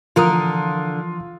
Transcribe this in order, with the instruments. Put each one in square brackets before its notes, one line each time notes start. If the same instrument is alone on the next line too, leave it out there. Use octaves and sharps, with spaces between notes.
[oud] D3 A#4 [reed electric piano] E3 F3 D#6 [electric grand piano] F4